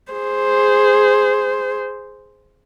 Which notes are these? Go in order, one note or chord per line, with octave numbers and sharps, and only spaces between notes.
G#4 C5